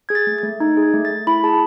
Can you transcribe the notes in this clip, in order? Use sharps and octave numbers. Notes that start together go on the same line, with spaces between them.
G#4 G#6
A6
A3
A6
A3
D#4 G#6
G#4
G#6
A3
A6
A3
E4 B5
G#4 A5